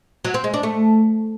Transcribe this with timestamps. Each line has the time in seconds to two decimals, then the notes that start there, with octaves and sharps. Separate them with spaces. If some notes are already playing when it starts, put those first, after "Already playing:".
0.25 F#3
0.34 C4
0.44 G#3
0.54 D4
0.63 A3